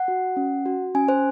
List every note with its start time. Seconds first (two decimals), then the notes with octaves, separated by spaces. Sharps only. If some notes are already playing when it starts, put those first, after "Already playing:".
Already playing: F#5
0.08 F#4
0.37 C#4
0.66 F#4
0.95 C#4 G#5
1.08 C5